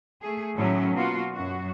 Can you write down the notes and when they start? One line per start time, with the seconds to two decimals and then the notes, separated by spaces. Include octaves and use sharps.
0.22 A3 G#4
0.54 A2 D#3 F#3 A3 C#4
0.93 B2 A#3 F4 F#4
1.33 F#2 F#4